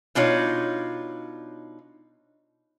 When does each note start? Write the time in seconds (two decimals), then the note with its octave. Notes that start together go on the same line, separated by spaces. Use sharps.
0.15 B2 D4 D#4 F4 C#5